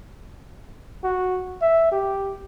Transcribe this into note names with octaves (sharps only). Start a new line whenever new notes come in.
F#4
E5
G4